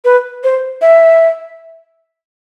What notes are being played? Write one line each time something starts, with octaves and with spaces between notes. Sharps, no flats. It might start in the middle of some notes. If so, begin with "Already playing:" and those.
B4
C5
E5